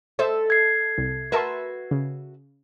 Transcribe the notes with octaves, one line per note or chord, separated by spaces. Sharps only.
A4 C5 D#5 E5
G#6 C7
C2
F#4 A#4 B4 E5 A5 C6
C#3